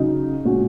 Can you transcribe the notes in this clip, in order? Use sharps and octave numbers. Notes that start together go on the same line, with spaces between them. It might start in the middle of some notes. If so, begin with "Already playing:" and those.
Already playing: C#3 F#3 D#4
A#2 G#3 C#4 F#4